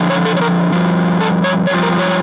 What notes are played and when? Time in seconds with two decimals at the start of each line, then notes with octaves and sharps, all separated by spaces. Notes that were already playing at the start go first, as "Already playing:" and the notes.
Already playing: F2 D3 F3
0.10 C#5
0.25 A4
0.37 C#5
0.41 A#4
0.72 G2 F3
1.20 A4
1.44 C#5
1.67 G2 F3 C#5
1.83 A#4
1.99 C#5